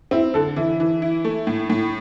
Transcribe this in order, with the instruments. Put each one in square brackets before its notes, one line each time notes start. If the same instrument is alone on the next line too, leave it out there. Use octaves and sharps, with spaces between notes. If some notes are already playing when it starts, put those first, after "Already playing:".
[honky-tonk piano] C4 [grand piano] E4
[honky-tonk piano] D3 [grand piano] A4
[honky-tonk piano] E3 [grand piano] E4
[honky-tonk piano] E3
E4
A3
A2
A2